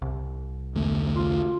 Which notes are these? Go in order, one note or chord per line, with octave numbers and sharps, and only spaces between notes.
C2
E2 D3 A3
F4